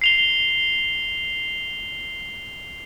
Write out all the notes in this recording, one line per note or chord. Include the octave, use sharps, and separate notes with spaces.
C7 F7 G7